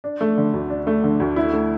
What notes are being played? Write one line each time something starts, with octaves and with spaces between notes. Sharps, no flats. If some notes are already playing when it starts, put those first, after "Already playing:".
D4
A3
D3
D2
D4
A3
D3
D2
E4
A3